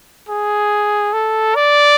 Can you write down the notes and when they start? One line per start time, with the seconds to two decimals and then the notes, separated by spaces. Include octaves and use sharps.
0.29 G#4
1.13 A4
1.56 D5